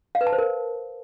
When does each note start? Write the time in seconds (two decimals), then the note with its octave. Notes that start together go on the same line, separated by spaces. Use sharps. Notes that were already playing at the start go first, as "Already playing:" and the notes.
0.15 F5
0.21 B4
0.27 A5
0.32 C5
0.38 A#4